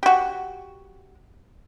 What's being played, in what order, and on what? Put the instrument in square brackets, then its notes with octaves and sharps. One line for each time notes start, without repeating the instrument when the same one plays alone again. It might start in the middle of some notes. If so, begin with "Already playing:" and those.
[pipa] F#4 G4